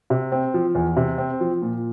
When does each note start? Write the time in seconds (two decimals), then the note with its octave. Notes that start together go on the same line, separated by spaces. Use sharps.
0.10 C3
0.32 C4
0.54 F3
0.75 E2
0.96 C3
1.18 C4
1.41 F3
1.62 A#2